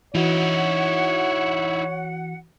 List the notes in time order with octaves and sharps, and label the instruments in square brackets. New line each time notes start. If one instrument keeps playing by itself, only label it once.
[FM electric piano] E3 F#4 [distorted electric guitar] D#4 E4 [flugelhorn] C#5 [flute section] F#5